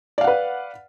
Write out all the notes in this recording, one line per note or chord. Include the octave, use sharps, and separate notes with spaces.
B4 D5 F5 F#5